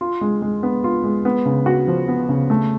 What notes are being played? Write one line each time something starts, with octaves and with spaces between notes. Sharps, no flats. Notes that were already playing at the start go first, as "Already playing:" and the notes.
F4
G#3
G#3
B3
F4
G#3
B3
C#3
F#4
F3
B3
C#3
A3